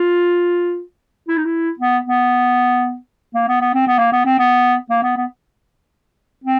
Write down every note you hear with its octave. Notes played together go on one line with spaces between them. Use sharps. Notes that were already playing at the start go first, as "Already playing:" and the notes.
Already playing: F4
E4
D#4
E4
B3
B3
A#3
B3
B3
C4
B3
A#3
B3
C4
B3
A#3
B3
B3
C4